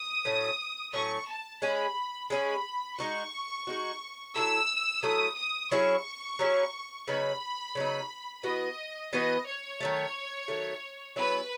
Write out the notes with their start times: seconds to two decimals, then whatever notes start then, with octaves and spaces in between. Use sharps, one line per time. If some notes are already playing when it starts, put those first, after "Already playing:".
Already playing: D#6
0.25 A2 F#3 A3 C#4
0.93 A2 F#3 A3 C#4 C#6
1.28 A5
1.62 G#3 C#4 G#4 B5
2.30 G#3 C#4 G#4 B5
2.98 G#3 D#4 F#4 C#6
3.67 G#3 D#4 F#4
4.35 F#3 A3 E4 A4 E6
5.03 F#3 A3 E4 A4 D#6
5.37 D#6
5.71 F#3 C#4 E4 G#4 C#6
6.39 F#3 C#4 E4 G#4
7.07 C#3 F#3 B3 D#4 B5
7.75 C#3 F#3 B3 D#4
8.43 E3 B3 F#4 B4 D#5
9.12 E3 B3 F#4 B4 D#5
9.46 C#5
9.81 D#3 F#3 A3
10.48 D#3 F#3 A3
11.16 F#3 B3 E4 G#4 B4